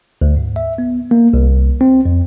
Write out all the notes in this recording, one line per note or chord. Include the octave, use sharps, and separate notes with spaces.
D2
G#2
E5
B3
A#3
C2
C4
F2